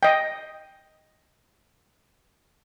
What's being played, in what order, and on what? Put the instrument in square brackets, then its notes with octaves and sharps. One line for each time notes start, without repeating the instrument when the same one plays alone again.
[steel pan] D#5 G5